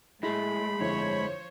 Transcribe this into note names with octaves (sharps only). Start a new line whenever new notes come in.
A2 G#3 A3 E4 B5
G1 F2 F3 E4 C5 C#5